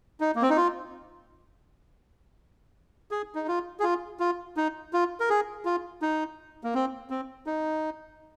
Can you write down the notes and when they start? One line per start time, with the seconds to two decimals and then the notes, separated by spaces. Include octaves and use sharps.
0.20 D#4
0.36 A#3
0.42 C4
0.50 D#4
0.57 F4
3.11 G#4
3.35 D#4
3.48 F4
3.80 G#4
3.83 F4
4.20 F4
4.57 D#4
4.93 F4
5.20 A#4
5.30 G#4
5.65 F4
6.02 D#4
6.64 A#3
6.75 C4
7.10 C4
7.46 D#4